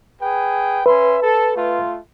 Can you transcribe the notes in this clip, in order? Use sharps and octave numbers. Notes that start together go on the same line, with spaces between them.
G#4 B4 G5
C#4 B4 E5 C6
A4
A3 F4